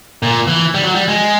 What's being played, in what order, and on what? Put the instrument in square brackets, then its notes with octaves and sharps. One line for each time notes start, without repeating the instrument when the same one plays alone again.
[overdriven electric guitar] A#2
E3
G3
F#3
G3
G#3